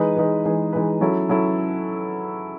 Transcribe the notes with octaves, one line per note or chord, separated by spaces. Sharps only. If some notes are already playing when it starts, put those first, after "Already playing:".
Already playing: E3 G#3 D#4 G#4 B4
E3 G#3 D#4 G#4 B4
E3 G#3 D#4 G#4 B4
E3 G#3 D#4 G#4 B4
F#3 C#4 E4 A4
F#3 C#4 E4 A4